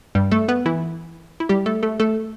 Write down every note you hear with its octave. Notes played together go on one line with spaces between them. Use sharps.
G2 G3
A3 A4
B3 B4
E3 E4
E4
G3 G4
A3 A4
A3 A4
A3 A4